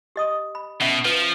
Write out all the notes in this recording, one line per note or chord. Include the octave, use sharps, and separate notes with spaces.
G4 D#5 D#6
B5
B2 C#4 E5
F3 B4